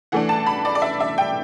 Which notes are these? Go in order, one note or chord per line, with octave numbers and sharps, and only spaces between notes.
E3 A3 D4 F#5
A5
B5
D5
D5
E5
E5
G5